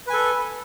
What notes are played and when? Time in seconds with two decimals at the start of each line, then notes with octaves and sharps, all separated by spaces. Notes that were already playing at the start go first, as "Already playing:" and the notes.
0.07 B4
0.10 G#5
0.13 A4